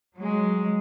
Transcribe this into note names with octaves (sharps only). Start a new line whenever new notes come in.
F#3 G#3